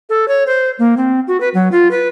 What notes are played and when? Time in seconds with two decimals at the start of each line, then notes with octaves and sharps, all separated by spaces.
0.10 A4
0.28 C#5
0.47 C5
0.79 A#3
0.97 C4
1.28 F#4
1.41 B4
1.54 F#3
1.72 F4
1.91 B4